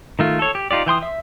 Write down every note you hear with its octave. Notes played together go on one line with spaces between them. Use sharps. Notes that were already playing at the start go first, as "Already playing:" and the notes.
D#3 A3 F4
A4 C#5
G4
D#4 F4 G4 D5
E3 G5 C6 D#6
E5